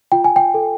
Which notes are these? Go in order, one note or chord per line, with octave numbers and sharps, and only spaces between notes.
F4 G5
G#5
G5
A4